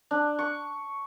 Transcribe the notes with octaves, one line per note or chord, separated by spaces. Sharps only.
D4
C#6